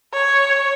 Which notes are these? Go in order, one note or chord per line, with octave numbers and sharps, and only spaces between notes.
C#5